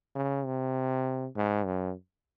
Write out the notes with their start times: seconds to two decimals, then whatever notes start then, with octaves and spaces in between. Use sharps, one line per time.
0.15 C#3
0.46 C3
1.36 G#2
1.66 F#2